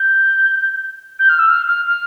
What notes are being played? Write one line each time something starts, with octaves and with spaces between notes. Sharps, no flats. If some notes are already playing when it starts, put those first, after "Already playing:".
Already playing: G6
G6
F6
E6
F6
F6
F6